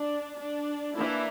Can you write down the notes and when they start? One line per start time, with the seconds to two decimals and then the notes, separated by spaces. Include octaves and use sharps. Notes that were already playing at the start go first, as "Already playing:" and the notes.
Already playing: D4
0.40 D4
0.94 E3 A#3 D4 E4